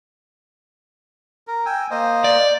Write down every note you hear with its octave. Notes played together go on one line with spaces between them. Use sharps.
A#4
G5 G#5 E6
A#3 C5 D#5
D5